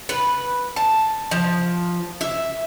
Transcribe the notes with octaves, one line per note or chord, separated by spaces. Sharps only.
B4
A5
F3
E5